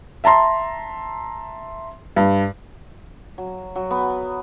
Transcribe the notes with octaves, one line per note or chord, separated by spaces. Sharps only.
E5 A5 A#5 C6
G2
F#3
F#3
B3